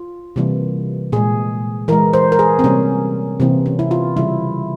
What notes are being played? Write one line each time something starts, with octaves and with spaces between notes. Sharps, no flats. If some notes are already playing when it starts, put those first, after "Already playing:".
Already playing: F4
C3 E3 G3 A#3
A#2 G#3 G#4
E3 G#3 A#4
C5
A#4
G#4
C4
C3 G3 A#3 C#4
C3 E3 A#3 C4
C#4
E4
F4
C#3 E3 G3 E4